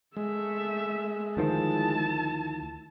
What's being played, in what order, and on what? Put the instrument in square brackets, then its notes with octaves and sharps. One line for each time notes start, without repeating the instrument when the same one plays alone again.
[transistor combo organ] G#3 [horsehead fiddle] A3 E5
[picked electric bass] D2 D#3 F3 [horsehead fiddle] E4 A5